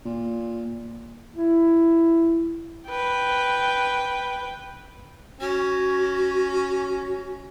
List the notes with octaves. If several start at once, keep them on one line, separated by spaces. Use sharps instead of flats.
A#2
E4
B4 G5
C#4 F#4